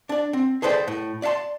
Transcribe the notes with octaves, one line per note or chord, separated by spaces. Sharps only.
D4 D5
C4
G#4 A4 B4 C5 D5 G5
A2
D5 E5 F5 A5 C6